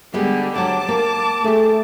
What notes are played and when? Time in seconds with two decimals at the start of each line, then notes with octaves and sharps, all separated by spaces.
0.14 D3 G3 G#3 B3 G4
0.56 D2 F#3 F#5 A5 D6
0.88 A#3 G4
1.44 A3 G4 G#4